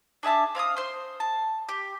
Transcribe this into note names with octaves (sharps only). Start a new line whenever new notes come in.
D4 G#4 E5 A5
C4 F5 G#5 D#6
C5 C6
A5
G4